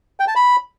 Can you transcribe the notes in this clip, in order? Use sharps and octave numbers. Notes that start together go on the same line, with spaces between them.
G5
A5
B5